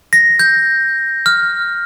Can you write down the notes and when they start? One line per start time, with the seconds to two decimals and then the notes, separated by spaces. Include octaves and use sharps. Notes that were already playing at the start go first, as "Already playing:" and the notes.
0.13 A#6
0.39 G6
1.26 F6